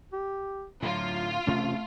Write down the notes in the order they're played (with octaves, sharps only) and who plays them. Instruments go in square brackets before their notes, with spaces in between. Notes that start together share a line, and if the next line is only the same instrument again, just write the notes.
[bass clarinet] G4
[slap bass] A2 D3 [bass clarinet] F#3 [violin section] F4
[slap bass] E1 C3 C#4 [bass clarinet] A3